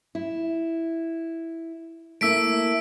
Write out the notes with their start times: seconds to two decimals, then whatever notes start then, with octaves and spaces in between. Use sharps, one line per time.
0.15 E4
2.21 A3 A#3 E4 E6 B6 D7